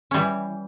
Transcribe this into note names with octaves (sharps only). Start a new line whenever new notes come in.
E3 G3 C#4